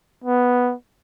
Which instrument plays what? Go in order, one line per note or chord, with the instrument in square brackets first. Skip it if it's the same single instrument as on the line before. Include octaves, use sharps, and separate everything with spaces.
[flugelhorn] B3